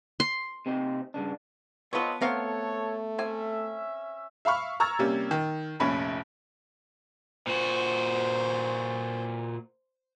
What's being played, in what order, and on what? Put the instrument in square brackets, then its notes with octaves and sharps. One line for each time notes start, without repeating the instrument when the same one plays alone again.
[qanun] C6
[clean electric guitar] C3 C4 D#4
G2 C#3 D4
[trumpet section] G#3 C4 D#5 [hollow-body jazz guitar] B3 B4 [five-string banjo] F4 A4 C#5
[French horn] A3 [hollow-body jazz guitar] B3 [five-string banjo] C4 F5 A#5 [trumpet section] A4 C#5
[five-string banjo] C4 G#5 [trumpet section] C#4 E5
[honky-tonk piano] E5 F5 B5 C#6 F6
A#5 C#6 E6 F6 G#6 A6
C3 G3 A#3 C#4
D#3
F1 A#1 C#4 B5 B6
[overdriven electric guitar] A#2 F#4 [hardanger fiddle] C5